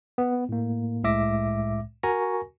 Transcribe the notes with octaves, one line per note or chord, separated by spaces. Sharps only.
B3
A2 A#3
C2 A2 G#3 E5 D6 A#6
F#4 A#4 G#5 A#5 C#6 A#6